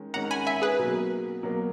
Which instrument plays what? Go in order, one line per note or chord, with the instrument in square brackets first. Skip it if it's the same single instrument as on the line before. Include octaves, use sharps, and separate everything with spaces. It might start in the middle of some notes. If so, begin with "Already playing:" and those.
Already playing: [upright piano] D#3 G#3 C#4
[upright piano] D#3 G#3 C#4 [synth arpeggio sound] F#5 A#5
[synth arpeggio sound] G#5 B5
E5 G#5
G#4 B4
[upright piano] B2 F#3 A#3
B2 F#3 A#3